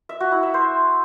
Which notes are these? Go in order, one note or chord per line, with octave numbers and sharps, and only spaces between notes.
E5
F#4
E4
E5
C5